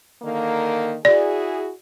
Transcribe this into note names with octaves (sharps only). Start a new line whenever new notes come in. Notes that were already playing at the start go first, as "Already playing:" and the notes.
D3 D#3 A#3
E4 F#4 G#4 D5